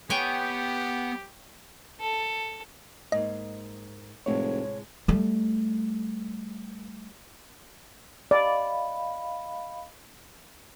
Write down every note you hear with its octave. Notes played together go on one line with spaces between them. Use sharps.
B3 G4 B4 C#5 G5 G#5
A4
G#2 A#3 D#5
F1 A2 C3 G#3 C#5
G3 A3
D5 D#5 F5 B5